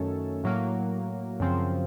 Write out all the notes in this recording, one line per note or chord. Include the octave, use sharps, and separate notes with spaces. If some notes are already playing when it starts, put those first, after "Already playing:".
Already playing: F#2 D#3 A3 C#4 A4
A2 F#3 A#3
F#2 C#3 F3 C4